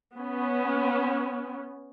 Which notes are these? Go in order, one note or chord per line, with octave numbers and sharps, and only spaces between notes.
B3 C#4